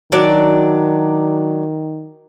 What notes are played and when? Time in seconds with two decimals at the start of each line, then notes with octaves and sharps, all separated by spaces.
0.12 D#3 F#3 D4 D5